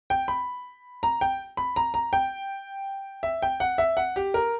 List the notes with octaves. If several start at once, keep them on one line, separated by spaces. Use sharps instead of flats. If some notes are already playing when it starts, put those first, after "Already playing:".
G5
B5
A#5
G5
B5
A#5
A#5
G5
E5
G5
F#5
E5
F#5
G4
A#4